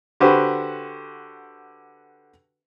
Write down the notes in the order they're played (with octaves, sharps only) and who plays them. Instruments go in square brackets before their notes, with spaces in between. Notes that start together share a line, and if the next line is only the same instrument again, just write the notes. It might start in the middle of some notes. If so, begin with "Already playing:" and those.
[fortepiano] D3 F#4 G4 B4 C5